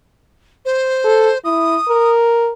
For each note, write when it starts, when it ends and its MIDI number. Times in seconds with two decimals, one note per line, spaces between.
0.65 1.38 72
1.04 1.31 69
1.44 1.76 64
1.44 2.11 87
1.88 2.51 70